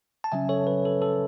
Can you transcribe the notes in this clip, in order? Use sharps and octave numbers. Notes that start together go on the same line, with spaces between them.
A5
C#3 F#3 C#4 E5 G#5
A4 C#5
B4
A4
A4